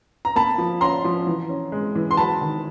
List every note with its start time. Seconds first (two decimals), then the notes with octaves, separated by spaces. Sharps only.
0.25 A#5
0.36 A#3 A5 B5
0.58 F3
0.81 C#4 A#5 C6
1.05 F3
1.27 E3
1.49 C#4
1.72 G#3
1.95 E3
2.11 C6
2.17 F#3 A5 B5
2.41 D#3